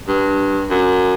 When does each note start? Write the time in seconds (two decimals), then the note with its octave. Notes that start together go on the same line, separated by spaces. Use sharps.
0.08 G2
0.70 F#2